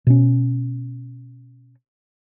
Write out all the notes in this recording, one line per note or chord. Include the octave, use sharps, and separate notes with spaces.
B2 C#4